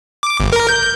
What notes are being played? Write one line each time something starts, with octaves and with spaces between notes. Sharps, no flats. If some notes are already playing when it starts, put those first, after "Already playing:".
D6
G1
A#4
G6